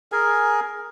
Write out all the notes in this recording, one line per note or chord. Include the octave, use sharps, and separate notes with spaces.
G#4 A#4 G#5